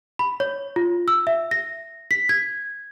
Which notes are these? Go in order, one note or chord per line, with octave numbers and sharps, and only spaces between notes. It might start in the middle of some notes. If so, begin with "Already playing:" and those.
B5
C#5
F4
E6
E5
A#6
B6
G#6